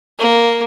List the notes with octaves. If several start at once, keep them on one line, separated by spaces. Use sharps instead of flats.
A#3